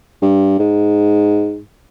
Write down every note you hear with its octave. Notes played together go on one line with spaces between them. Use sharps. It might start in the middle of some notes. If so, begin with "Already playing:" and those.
G2
G#2